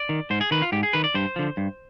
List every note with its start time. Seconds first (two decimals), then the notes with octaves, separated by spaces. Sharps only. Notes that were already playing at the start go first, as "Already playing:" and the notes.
Already playing: D5
0.09 D#3
0.30 G#2 C5
0.41 G#4
0.51 D#3 B4
0.62 F4
0.72 G#2 G4
0.83 G#4
0.93 D#3 B4
1.04 D5
1.14 G2 C5
1.36 D3 F3
1.57 G2